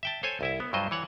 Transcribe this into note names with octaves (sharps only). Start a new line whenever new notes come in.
E5 G5 A5
A4 C5 C#5 G#5
C2 E4 E5
B3
G2 F#3 F4 C5 D#5
E3 C#5 F#5